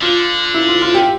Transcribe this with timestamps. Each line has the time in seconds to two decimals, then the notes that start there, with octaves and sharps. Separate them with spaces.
0.01 D3 F4
0.54 E4
0.69 F4
0.82 F4
0.94 G4